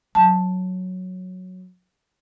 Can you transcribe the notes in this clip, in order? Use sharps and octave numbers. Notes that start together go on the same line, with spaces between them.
F#3 A5